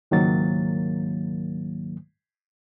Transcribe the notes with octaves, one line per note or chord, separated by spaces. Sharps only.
C#2 G#2 D#3 F#3 A#3 A6